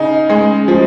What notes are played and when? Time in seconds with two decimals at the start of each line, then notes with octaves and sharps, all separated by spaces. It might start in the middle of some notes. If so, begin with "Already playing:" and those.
Already playing: C#3 D#4
0.30 G#3
0.68 F3